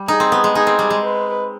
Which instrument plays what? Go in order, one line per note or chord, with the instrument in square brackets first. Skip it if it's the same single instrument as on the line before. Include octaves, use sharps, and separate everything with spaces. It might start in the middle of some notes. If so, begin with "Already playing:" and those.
Already playing: [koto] G3
[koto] D#4 [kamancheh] G#4
[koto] C4
B3
G#3
[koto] D#4 [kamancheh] G#4
[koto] C4
G3
G#3
[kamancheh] B4